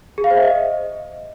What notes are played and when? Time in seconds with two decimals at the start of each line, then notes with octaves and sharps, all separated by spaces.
0.18 G#4
0.24 F5
0.30 C5
0.37 E5
0.43 D#5